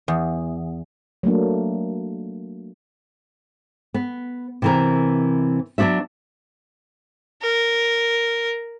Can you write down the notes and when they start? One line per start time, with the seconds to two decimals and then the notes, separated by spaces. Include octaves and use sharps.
0.08 E2
1.23 F#3 A3 A#3 D4
3.94 B3
4.62 C3 E3 A#4
5.78 F#3 B3 D4 F#4 E5
7.42 A#4